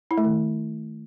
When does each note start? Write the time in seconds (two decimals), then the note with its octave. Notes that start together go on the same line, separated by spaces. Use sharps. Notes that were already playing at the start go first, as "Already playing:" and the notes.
0.11 E4
0.18 A3
0.24 D#3